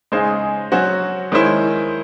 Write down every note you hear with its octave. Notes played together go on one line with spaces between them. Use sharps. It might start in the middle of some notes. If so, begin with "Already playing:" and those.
C#3 G#3 D#4 G#4 C5
F#3 C#4 F#4 C5
D#3 G#3 C#4 E4 C5